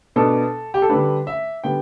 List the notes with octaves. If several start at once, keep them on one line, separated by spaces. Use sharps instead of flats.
B2 B3 D4 A4
G4
A4
D3 G3 D4 B4
E5
D3 G3 B3 G5